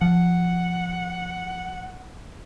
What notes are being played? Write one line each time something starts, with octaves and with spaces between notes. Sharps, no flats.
F3 F#5